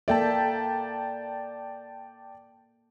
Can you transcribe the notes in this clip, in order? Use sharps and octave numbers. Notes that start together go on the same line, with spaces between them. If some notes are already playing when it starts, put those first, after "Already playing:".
A#3 A4 D5 E5 G5 A5